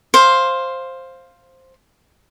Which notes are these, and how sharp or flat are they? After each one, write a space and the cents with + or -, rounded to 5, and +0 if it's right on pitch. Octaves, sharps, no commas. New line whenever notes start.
C5 +10 F5 +0